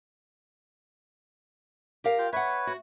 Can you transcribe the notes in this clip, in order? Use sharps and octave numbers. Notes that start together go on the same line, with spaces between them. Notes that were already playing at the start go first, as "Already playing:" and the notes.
G4 A#4 F5
F4 G5
B4 C#5 E5 F#5
F#4